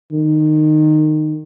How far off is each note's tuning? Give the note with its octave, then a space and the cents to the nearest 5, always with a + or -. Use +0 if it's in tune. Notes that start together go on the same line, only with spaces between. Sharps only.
D#3 -20